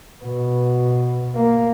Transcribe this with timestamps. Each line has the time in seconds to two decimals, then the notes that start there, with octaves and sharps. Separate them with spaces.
0.24 B2
1.35 A#3